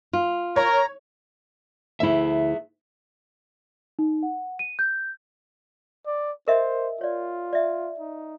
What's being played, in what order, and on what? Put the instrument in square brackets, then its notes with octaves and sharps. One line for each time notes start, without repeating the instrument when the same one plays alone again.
[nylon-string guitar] F4
[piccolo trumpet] A#4 [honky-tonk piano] C#5 [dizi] A#5
[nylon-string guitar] D2 E4 [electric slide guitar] G#4 E5
[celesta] D#4
F#5
D#7
G6
[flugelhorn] D5
[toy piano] A#4 D#5 E5 [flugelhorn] C5
[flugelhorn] F4 [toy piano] C#5 D5
[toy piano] D5 E5
[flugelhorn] D#4